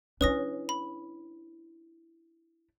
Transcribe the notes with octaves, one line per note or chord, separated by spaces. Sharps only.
C#4 D4 E4 B4 D#6 A#6
B5